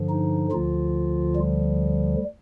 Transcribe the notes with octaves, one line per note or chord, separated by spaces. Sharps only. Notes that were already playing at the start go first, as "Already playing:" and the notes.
Already playing: G2 D3 F3
D#4
D2 D3 F3 F4
G3